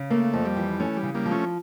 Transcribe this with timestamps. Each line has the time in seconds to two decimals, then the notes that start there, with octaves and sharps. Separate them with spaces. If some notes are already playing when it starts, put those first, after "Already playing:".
Already playing: C#3
0.10 A3 A#3
0.33 F2
0.45 G3
0.57 E3
0.80 A3 C#4
0.97 G3
1.03 C#3
1.14 G3 A#3
1.26 F3
1.31 A3 C#4